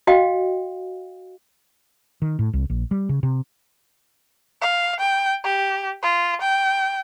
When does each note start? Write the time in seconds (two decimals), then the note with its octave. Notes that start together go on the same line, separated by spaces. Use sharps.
0.07 F#4 D#5 F5 G5
2.22 D#3
2.39 A2
2.53 C2
2.70 A#1
2.91 G3
3.09 C#3
3.23 C3
4.61 F5
5.00 G5
5.44 G4
6.03 F4
6.41 G5